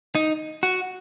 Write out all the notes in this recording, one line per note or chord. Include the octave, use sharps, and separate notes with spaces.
D#4
F#4